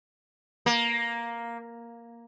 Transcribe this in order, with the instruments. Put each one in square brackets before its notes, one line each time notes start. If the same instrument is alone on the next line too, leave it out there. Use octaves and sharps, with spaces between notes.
[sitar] A#3